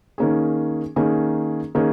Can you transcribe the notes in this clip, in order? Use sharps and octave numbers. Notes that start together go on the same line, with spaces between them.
D#3 A#3 C#4 G#4
D#3 A#3 C#4 G#4
D#3 A#3 C#4 G#4